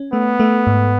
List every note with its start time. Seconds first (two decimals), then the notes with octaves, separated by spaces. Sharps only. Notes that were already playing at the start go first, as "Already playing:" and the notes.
Already playing: C#4
0.12 A3 B3
0.40 A3
0.67 G#2